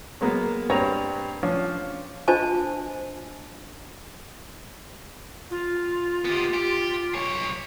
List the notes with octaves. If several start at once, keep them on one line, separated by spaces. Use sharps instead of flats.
F#3 G#3 A#3 B3
G2 C4 B4 C#5 A#5
F3 C#4 D4 F4
D4 F4 C5 D#5 G#5 A5
F4
B3 G4
G4
B1 C#5